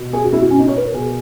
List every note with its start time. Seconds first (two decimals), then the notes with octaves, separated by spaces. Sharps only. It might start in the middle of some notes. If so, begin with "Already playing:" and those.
Already playing: B2
0.13 G#4
0.25 F#4
0.33 E4
0.42 F#4
0.50 C#4
0.59 D#4
0.68 C#5
0.77 B4
0.86 A#4
0.93 B2 G#4